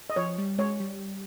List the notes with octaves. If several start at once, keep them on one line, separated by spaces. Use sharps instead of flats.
D#5
F3 C#5
G3
G#3 C#5
G3